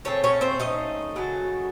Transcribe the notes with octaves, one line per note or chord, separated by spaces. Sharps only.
C#3 A3 C4 C#5
C#4 C#5
C4 C5
D#4 D#5
C#3 F#3 A3